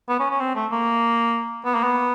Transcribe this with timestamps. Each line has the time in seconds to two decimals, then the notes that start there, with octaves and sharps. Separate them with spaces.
0.09 B3
0.20 C#4
0.30 C#4
0.40 C4
0.55 A3
0.72 A#3
1.65 B3
1.75 A#3
1.83 B3